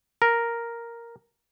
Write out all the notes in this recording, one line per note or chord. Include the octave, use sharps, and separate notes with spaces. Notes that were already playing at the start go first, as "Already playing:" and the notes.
A#4